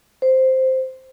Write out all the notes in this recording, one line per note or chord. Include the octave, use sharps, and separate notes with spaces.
C5